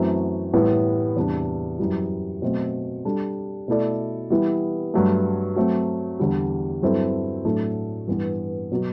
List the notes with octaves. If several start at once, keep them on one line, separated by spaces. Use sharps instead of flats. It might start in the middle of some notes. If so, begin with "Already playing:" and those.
Already playing: F#2 E3 A3 C4 F#4
A2 E3 G3 B3
E2 C3 G3 D4
F#2 E3 G3
B2 F#3 A3 C4
G3 D4 A4
B2 A3 E4 A4 D5
E3 G3 B3 E4
G2 F#3 A3
F#3 A3 C4
E2 D3 G3
G2 F#3 C4 E4 A4
A2 F#3 A3 D4 A4
G2 E3 B3
B2 F#3 B3 F#4